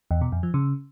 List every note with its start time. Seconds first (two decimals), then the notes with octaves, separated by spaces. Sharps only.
0.11 E2
0.21 B2
0.32 F2
0.43 F3
0.54 C#3